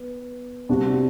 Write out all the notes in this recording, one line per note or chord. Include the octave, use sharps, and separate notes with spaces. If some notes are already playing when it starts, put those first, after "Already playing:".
Already playing: B3
C3 G3 D4 F#4